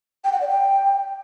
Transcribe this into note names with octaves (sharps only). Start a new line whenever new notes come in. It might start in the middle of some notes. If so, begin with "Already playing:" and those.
G5
F#5
D5
G5